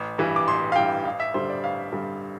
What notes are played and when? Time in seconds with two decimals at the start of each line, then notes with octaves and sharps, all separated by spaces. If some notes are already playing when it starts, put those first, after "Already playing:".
Already playing: A1
0.18 G2 E3 G3
0.36 D6
0.48 A1 C6
0.72 F5
0.76 G2 E3 G3 G5
1.05 A1 F5
1.20 E5
1.34 G2 D3 G3 C5
1.50 D5
1.63 A1 F5
1.92 G2 D3 G3